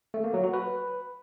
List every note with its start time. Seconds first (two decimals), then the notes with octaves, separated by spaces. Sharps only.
0.14 A3
0.24 A#3
0.34 F#3
0.44 F#4
0.53 B4